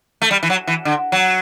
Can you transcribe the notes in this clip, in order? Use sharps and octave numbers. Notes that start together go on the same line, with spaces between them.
A3
G3
E3
F#3
E3
D3
F#3